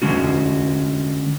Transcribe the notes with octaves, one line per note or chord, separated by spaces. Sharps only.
D3 G#3 C#4 F#4